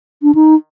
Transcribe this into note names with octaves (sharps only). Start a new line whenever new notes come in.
D4
D#4